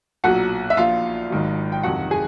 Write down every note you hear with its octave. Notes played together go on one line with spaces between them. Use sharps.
B1 A#2 F#3 F#4 F#5
E5
A#1 A#2 F3 F4 F5
G#1 G#2 D#3 F#3
G5
G1 F2 C3 D#3 F#3 F#4 F#5
G#4 G#5